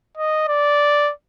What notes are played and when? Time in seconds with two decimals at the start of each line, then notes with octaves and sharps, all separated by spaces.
0.17 D#5
0.48 D5